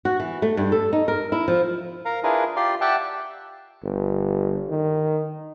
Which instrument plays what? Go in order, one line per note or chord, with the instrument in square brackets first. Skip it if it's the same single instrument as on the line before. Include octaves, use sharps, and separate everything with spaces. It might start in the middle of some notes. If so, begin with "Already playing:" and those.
[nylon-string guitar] F#4
E3
A3
G2
A4
D#4
A#4
E4
F3
[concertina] A#4 F5 A#5
D4 E4 F4 G#4 A#4 B4
F4 G4 D5 C6
G4 D5 E5 F#5 G5 A5
[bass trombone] G1
D#3